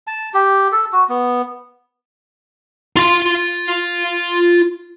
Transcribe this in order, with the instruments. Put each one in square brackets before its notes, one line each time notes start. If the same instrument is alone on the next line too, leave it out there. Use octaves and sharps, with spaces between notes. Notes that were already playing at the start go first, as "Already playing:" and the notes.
[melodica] A5
G4
A4
F#4
B3
[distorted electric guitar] F4 C6